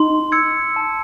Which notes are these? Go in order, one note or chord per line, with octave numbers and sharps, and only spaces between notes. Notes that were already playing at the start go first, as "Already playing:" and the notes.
Already playing: D#4 C6
E6 G#6 C#7
A5